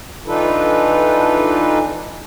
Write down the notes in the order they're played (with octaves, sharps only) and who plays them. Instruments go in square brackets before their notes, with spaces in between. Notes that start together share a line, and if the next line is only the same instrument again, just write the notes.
[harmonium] E3 D4 D#4 F4 A4 B4